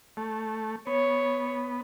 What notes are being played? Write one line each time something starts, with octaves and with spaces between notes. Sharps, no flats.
A3
B3 C#5